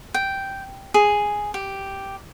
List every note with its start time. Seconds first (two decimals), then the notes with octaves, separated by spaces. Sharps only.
0.14 G5
0.94 G#4
1.54 G4